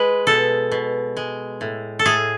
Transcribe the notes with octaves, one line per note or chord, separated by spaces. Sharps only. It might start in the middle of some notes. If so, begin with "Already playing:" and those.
Already playing: G#3 B4
B2 A4
B2
G#3
A2
A4
A2 G#4